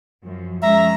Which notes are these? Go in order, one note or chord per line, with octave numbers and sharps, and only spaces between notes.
F#2 F3
F3 G#3 C#4 E5 A#5